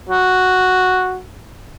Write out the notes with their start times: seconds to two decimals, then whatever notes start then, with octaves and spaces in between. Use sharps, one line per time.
0.09 F#4